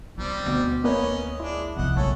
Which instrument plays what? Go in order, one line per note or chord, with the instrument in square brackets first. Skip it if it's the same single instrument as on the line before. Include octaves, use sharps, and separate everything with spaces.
[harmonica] G3 C4 D4 [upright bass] F4
[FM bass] D2 [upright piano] B2
[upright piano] A#3 B4 C#5 [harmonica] C#4 D#5
[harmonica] G#3 D4 [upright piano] E4
[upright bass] C3 F3 [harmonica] D#5 F#5
[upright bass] A#1 F#2 [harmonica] C#4 A4 C#5